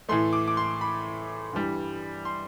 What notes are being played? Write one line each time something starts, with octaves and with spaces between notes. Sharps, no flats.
A2 E3 A3 C6
D6
D6
C6
B5
G2 E3 G3
C6